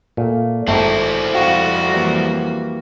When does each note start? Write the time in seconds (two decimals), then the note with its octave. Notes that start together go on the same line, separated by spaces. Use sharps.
0.17 A#2 A3 A#3
0.68 G#1 A3 C4 D#4 E4
1.33 F2 F#4 F5 G5 C#6
1.91 E3 G3 A#3